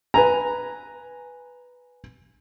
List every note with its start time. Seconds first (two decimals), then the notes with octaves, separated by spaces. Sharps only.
0.14 B4 G#5 A#5